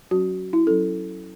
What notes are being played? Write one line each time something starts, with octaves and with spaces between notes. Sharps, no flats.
F#3 C#4 F#4
E4
F#3 C#4 A4